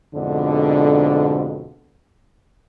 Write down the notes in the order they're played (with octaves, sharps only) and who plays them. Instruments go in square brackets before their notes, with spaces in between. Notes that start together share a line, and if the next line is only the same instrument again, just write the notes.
[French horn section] F2 G#2 B2 D3